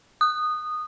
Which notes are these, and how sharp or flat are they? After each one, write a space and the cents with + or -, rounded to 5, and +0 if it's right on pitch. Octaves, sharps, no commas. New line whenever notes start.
D#6 -15